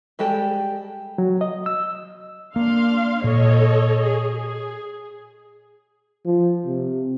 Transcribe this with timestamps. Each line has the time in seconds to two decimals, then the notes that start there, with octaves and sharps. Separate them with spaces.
0.19 G3 G#3 G4 A4 G5
1.18 F#3
1.41 D#5
1.66 E6
2.56 A#3 D4 F5 C6
3.24 A#2 A4 C#5 D#5
4.00 G#4
4.33 G#4
6.25 F3
6.66 C3